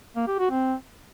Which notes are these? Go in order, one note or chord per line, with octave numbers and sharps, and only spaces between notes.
A#3
G4
F#4
C4